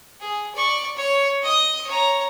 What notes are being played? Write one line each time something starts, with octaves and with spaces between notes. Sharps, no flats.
G#4
D5 C#6
C#5
D#5 D#6
C#5 A#5